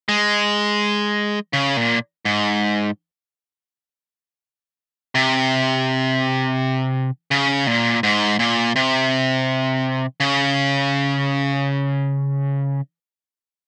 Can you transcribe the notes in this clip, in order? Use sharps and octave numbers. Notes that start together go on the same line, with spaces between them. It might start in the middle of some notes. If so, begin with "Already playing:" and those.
G#3
C#3
A#2
G#2
C3
C#3
A#2
G#2
A#2
C3
C#3